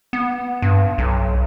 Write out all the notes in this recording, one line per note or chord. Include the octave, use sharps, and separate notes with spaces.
B3
G2
B1